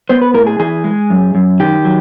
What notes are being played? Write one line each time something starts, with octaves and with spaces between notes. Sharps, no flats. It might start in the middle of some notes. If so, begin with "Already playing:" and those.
B3 C5
B4
A2 A#4
G#4
E3 G#4
G#3
F#2
F#2
D#3 G4
F#3